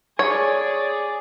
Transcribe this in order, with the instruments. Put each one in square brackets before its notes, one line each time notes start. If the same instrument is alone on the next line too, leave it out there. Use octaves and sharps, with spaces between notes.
[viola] G#4 D5 [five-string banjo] C#5